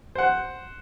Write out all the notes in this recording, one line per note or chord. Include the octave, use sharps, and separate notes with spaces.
C5 F#5